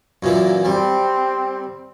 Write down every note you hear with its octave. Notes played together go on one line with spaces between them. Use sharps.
F#2 A#2 E3
G3 C4